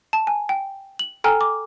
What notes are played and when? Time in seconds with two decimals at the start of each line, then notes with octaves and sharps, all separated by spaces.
0.13 A5
0.27 G#5
0.49 G5
0.99 F#7
1.24 A4 G5 G#5 A#5 F6
1.41 D6